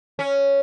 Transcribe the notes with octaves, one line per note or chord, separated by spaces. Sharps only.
C#4